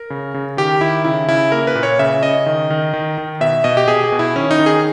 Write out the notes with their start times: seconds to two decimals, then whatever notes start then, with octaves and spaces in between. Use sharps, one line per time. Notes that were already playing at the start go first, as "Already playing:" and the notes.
Already playing: A#4
0.10 C#3
0.34 C#3
0.57 D#3 G4
0.81 D#3 E4
1.05 C#3 E4
1.28 C#3 E4
1.52 A#3 A#4
1.67 B4
1.75 A#2
1.83 C#5
1.99 C#3 E5
2.23 C#3 D#5
2.46 D#3
2.70 D#3
2.93 D#3
3.18 D#3
3.41 B2 E5
3.64 B2 D#5
3.77 G4
3.88 B2 G#4
4.04 G#4
4.12 B2
4.19 E4
4.36 D#3 C#4
4.51 D#4
4.59 D#3
4.66 G#4